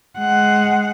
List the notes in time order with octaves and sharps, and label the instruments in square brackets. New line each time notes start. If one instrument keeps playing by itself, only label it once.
[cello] G#3 F#5